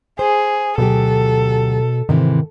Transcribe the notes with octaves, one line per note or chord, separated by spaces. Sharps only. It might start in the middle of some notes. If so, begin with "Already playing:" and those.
G#4 C5
D2 B2 F#3 G4 A4
G#2 C3 D#3 E3